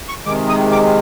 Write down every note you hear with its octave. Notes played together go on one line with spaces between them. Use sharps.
C#6
C3 D#3 G#3 D6
D#6
D6